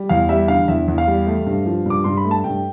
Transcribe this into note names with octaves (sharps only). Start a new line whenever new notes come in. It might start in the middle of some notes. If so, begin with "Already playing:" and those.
Already playing: G3
E2 F5
G3 E5
D3 F5
E2 E5
E2
F5
G3
A3
G2
F3
G2 D6
G2 C6
B5
A3
A5
G2 G5